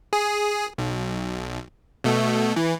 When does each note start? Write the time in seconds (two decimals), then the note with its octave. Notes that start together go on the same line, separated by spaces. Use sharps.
0.13 G#4
0.78 B1
2.04 B2 A3
2.56 E3